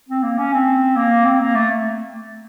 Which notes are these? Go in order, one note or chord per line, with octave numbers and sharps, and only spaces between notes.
C4
A#3
C#4
C4
A#3
C4
A#3
A3